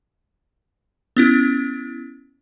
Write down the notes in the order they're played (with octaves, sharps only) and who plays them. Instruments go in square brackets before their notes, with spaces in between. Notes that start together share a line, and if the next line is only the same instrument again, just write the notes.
[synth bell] B3 C#4 E4